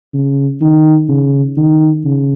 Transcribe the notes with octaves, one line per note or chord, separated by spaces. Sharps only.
C#3
D#3
C#3
D#3
C#3